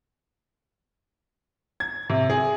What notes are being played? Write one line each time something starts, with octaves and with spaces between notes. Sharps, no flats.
G#6
C3
G#4